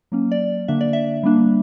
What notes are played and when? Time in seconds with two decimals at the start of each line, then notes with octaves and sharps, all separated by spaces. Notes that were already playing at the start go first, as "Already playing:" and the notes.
0.12 F#3 A#3 C#4
0.32 D5
0.68 D3 A#3 D4 E5
0.81 D5
0.93 E5
1.23 G3 A#3 D4